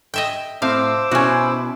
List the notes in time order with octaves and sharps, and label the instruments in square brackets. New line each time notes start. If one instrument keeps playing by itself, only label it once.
[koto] D#5 E5 G5
[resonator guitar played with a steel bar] A2 C4 E5 [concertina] C5 D6 E6 [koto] F5
[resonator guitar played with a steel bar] B2 E4 [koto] C#4 F#4